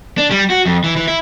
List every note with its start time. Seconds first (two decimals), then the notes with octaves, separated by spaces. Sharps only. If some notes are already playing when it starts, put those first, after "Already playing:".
0.18 D4
0.31 G3
0.50 F#4
0.66 F2
0.84 E3
0.96 E3
1.07 E4